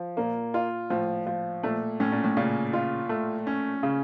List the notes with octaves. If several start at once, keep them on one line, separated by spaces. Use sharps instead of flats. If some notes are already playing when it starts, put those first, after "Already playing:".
Already playing: F3
A#2 A#3
F4
A2 F3
F3
A#2 A3
A2 C#4
A#2
A2
A#2 C#3
F4
A3
C#4
C#3